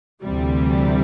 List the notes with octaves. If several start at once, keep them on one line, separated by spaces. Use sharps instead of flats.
D2 C3 E3 G3